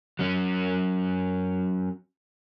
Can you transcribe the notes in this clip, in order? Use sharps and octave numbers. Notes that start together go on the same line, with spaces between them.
F#3 C#4